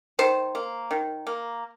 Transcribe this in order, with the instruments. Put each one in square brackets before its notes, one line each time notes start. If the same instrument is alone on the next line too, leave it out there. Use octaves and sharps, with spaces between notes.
[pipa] D#3 C5
A#3
D#3
A#3